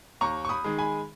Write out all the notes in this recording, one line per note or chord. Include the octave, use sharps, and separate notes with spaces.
D#2 A#5 C#6
C#6
B5 D#6
D#3 G#3
G#5 B5